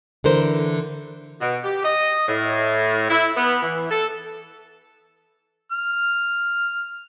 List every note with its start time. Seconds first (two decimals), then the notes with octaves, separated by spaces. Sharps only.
0.24 D3 E3 A#4 C5
1.41 B2
1.64 G4
1.84 D#5
2.28 A2
3.10 E4
3.36 B3
3.62 E3
3.91 A4
5.72 F6